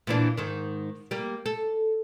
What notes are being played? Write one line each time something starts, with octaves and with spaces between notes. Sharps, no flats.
A#2 E3 D4
G#2 D#3
G3 A#3
A4